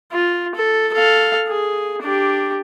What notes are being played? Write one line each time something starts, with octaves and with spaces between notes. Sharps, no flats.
F4
A4
A4 F5
G#4
D4 G4